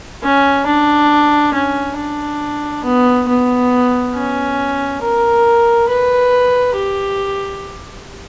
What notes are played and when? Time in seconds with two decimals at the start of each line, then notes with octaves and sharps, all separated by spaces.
0.23 C#4
0.66 D4
1.54 C#4
1.97 D4
2.84 B3
3.28 B3
4.14 C#4
5.02 A#4
5.89 B4
6.76 G4